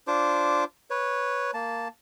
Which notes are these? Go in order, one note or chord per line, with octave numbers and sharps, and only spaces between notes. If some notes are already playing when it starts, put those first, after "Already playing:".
D4 F4 C5 D6
B4 C#5
A#3 A5